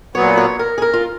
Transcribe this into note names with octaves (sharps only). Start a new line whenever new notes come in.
A#2 F#3 B3 C#5
C#5
A#4
G#4
A#4
F4